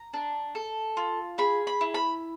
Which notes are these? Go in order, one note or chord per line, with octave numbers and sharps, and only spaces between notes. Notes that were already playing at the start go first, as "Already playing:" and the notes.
Already playing: A#5
D4
A4
F4
G#4 B5
B5
E4
B5